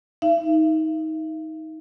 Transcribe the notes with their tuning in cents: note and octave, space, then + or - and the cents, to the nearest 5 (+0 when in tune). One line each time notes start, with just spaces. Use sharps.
D#4 +25 E5 +45